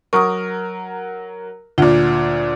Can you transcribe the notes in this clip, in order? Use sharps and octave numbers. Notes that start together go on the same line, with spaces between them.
F#3 A#4 C#6 D#6
D2 A#2 F4